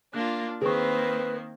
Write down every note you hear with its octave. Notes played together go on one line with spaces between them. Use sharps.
A#3 D4 F4 F#6
D#3 A#3 C4 G#4 B4 C#6